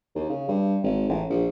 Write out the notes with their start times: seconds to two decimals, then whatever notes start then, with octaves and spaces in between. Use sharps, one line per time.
0.15 D#2
0.30 C#3
0.48 G2
0.83 G#1
1.09 A1
1.30 A#1